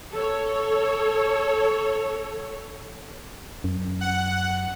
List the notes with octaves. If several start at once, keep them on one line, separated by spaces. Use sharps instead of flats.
A4 C#5
F#2
F#5